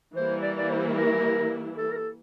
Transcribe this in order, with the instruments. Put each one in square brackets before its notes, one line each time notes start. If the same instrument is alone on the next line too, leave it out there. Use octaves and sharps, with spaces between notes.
[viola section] E3 G3 A#3 E4 [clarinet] C5
[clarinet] D5
D5
C5
A#4
A4
A#4
A4